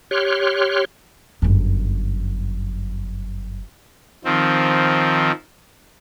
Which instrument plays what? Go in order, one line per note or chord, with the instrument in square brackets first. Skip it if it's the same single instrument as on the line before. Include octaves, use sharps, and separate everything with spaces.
[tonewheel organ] G4 C#5 C6 F6 F#6
[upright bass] G1 F#2
[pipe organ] D#3 F3 C4